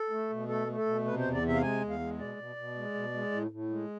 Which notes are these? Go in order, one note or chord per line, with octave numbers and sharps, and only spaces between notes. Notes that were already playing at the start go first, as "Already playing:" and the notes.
Already playing: A4
A3
B2
A3 A4
A3
A4
B2
C3 B4
E2 C5
D5
C3
E5
F5
G#3 G#5
E2
F5
G#3
B2 D5
B2
B2
G#3
B2
G#3
A2
A2
G#3